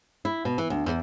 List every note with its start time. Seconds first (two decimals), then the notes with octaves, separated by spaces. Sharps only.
0.25 E4
0.45 B2
0.58 E3
0.70 D2
0.86 E2